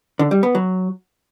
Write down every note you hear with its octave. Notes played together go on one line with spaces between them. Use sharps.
D3
G3
B3
F#3